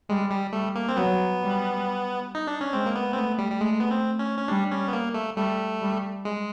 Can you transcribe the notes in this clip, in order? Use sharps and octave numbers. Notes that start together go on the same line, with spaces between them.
G3 G#3
G3
G3 A3
A#3
C4
F#3 B3
G3
D#4
D4
C#4
G#3 C4
A#3
B3
C4
A3 B3
G3
G3
G#3 A3
B3
C4
C#4
C#4
G3 D4
C#4
B3
A#3
A3
G3 A3
G3
G#3